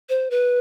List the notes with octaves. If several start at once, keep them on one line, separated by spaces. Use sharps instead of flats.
C5
B4